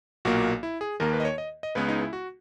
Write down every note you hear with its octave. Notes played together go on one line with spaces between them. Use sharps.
B1 A#2 A#3 F#4
E4
G#4
D#2 D#3 A#3 A#4
B4
D#5
C#5
D#5
D#5
C#2 C#3 G#3 B3 B4
D#4
E4
F#4